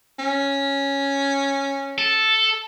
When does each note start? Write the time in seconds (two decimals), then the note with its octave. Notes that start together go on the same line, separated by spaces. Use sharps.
0.19 C#4
1.98 A4